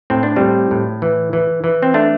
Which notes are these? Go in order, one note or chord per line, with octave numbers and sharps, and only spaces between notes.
A2 C4
D4
A2 G3 C4
A2
E3
E3
E3
C4
A3 D4